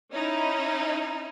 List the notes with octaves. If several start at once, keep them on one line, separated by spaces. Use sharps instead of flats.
C#4 D#4 E4